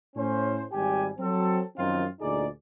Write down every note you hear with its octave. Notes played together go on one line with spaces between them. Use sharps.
A2 C#4 C5
G#1 G3 G4 G#5
F#3 C4 A4
F#2 D#3 F3 C4 D#4 F4
D2 A#2 D#4 G#4 D5